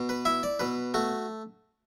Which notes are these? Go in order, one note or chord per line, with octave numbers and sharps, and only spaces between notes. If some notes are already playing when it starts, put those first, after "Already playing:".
Already playing: B2
B4
E4 E5
D5
B2 B4
A3 F#4